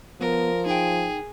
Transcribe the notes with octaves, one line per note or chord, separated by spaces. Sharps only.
F3 B3 A#4
D#4 G#4 G5